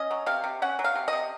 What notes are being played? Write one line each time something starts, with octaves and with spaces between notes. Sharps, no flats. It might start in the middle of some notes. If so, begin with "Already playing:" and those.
Already playing: C#4 D#5
F#3
C3 F5
C3
C#4 F#5
F#3
F5
C3
D#5
C3